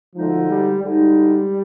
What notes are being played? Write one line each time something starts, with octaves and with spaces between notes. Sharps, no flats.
D2 D3 F3 G#3 D#4
G3
D2 D3 G3 G#3 D#4